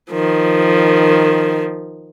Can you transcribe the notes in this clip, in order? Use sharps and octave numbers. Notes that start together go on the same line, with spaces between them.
D#3 F3